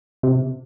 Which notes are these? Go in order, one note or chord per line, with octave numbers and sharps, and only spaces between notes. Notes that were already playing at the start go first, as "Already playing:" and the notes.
C3